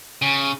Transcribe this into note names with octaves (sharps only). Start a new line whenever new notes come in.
C#3